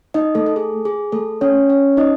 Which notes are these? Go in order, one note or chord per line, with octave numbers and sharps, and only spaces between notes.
D#4 D#5
A3 A4
A4
G#4
G#4
A3 A4
C#4 C#5
C#4 C#5
D#4 D#5